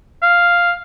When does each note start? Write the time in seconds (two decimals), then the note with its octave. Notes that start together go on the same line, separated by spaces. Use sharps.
0.23 F5